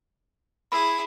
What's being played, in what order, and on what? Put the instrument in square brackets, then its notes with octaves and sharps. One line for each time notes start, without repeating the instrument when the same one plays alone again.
[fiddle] E4 G#4 [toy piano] B5 E6